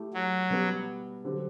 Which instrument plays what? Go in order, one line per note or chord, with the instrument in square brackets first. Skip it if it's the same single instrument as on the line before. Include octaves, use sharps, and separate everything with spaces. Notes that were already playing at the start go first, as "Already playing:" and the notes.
Already playing: [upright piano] A3 E4 G4
[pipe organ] F#3
[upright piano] B2 G3 B3
D3 F#3 C4 G4